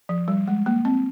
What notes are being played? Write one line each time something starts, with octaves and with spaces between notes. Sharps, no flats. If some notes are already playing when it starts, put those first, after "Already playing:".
F3
G3
G#3
A#3
C4